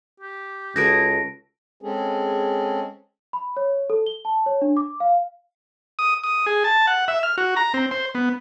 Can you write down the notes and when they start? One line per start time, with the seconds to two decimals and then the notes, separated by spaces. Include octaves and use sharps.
0.20 G4
0.76 C#2 F#4 G#4 A4 B4 A#6 D7
1.82 G#3 C4 C#4 G#4 A4
3.33 B5
3.57 C#5
3.90 A4
4.07 G7
4.25 A5
4.46 C#5
4.62 D4
4.77 D6
5.00 F5
5.99 D#6
6.24 D#6
6.46 G#4
6.64 A5
6.87 F#5
7.08 E5
7.23 F6
7.38 F#4
7.56 A#5
7.74 C4
7.91 C5
8.15 B3